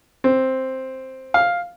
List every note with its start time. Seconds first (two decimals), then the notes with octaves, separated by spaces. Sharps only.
0.24 C4
1.34 F5